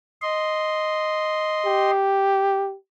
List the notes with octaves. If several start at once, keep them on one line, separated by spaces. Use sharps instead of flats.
D#5 C6
G4